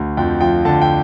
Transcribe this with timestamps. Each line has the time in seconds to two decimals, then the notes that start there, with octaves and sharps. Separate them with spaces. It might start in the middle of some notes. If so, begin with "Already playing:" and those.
Already playing: D2
0.17 F2 G5
0.41 F3 G5
0.65 D3 A5
0.82 G5